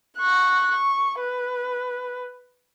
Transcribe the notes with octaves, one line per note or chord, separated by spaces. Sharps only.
C#6 F#6
C#6
B4